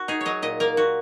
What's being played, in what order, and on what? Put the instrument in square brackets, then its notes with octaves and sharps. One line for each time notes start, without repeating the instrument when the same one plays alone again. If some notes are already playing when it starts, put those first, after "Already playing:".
Already playing: [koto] F#4
D#4 G#4
C#5
F#3 D#5
A#2 D#5
A#3 A#4
A#2 F#4